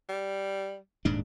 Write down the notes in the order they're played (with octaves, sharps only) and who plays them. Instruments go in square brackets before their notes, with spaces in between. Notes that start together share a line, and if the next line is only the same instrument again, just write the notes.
[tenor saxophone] G3
[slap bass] D#1 G#2 D4